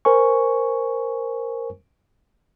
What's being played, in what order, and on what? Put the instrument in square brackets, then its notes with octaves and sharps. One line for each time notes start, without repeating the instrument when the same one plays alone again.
[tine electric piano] A#4 C5 G#5 C#6